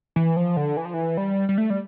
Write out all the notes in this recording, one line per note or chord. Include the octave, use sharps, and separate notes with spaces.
E3
F3
D3
E3
F3
E3
G3
G3
A3
G3